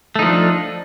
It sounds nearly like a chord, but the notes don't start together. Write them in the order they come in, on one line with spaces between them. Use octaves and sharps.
A3 D#4 F3 D4